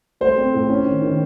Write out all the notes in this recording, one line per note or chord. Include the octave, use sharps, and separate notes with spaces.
A3 C5
C4
A2
C#4
D#3
D#3